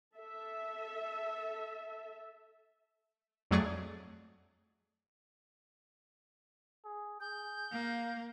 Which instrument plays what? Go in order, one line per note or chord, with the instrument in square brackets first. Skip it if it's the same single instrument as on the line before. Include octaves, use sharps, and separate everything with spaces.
[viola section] A4 E5
[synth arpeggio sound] F2 F#3 A3 G#4 D5 C#6
[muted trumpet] G#4
[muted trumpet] G#4 [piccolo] G6
[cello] A#3 [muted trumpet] F5